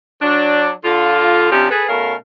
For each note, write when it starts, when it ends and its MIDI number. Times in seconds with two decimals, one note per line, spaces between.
0.22 0.71 54
0.22 0.71 62
0.85 1.50 50
0.85 1.50 65
1.52 1.69 48
1.52 1.69 53
1.52 1.69 61
1.52 1.69 62
1.52 1.69 67
1.70 1.87 68
1.70 1.87 69
1.70 1.87 71
1.89 2.14 47
1.89 2.14 57
1.89 2.14 61
1.89 2.14 70
1.89 2.14 77